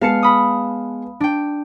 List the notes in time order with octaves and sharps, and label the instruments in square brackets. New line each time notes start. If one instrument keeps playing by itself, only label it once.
[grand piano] G#3 B3 [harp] F5 A5 C#7
[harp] B5 D#6
D4 G5